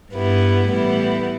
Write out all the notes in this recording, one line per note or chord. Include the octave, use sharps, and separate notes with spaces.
G2 G3 B3 E4
A2 E3 G3 B3 E4